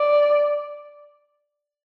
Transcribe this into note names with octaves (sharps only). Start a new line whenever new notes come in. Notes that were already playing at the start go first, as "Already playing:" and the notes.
Already playing: D5